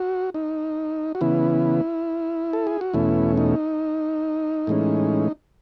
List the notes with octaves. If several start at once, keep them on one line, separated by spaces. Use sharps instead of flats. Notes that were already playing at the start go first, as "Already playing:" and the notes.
Already playing: F#4
D#4
F#4
C#3 E3 B3 E4
A4
G#4
F#4
E2 B2 A3 C#4 E4
D#4
A2 E3 G#3 C#4